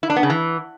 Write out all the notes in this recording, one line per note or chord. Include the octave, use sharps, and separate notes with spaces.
E4
D4
B3
C#3
E3